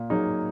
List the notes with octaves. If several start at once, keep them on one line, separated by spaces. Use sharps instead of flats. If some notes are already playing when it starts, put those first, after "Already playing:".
Already playing: A#2
F#3 A#3 D#4 G#4